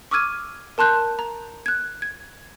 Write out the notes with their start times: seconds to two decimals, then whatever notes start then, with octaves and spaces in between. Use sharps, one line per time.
0.11 C#6 D6 E6 F6 G#6 D#7
0.78 A#4 A5 C6 F#6 G6
1.19 A#5
1.66 F#6 G#6
2.02 G#6